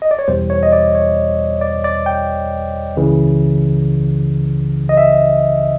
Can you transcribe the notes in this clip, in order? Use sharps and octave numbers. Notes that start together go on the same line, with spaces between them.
D#5
D5
C#5
E2 B2 G3 C5
C#5
D#5
D5
C#5
D5
D5
G5
C#2 C#3 E3
D#5
E5